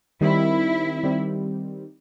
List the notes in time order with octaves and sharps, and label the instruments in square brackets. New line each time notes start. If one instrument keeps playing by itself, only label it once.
[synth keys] D#3 G3 C4 [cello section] E4
[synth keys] D#3 G3 C4